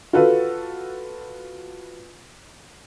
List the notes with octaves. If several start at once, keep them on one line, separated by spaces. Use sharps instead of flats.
F4 F#4 A4 B4